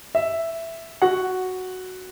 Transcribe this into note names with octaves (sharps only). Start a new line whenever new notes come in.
E5
F#4 F#5